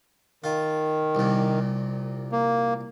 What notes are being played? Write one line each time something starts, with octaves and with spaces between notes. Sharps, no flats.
D#3 F4
C2 A#2
A#3